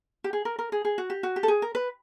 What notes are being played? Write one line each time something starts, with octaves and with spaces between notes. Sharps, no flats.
G4
G#4
A#4
A#4
G#4
G#4
F#4
G4
F#4
G4
A4
G#4
A#4
B4